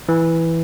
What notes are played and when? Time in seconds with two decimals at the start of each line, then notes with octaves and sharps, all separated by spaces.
0.09 E3